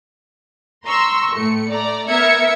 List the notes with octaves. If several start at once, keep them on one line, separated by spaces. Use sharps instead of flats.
A#5 C6 C#6 E6
A2 A3 C#7
A3 D5 A#5
B3 A#4 E5 A#5 G#6 C#7